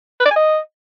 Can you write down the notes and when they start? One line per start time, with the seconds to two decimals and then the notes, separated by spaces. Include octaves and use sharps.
0.20 B4
0.25 D5
0.31 G#5
0.36 D#5